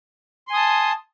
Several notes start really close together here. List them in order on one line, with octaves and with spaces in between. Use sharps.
C6 G#5 D#6 A5